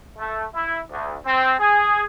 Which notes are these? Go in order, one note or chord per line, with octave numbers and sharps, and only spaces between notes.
A3
E4
D2
C4
G#4